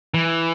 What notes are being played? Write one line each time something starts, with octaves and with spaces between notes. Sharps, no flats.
E3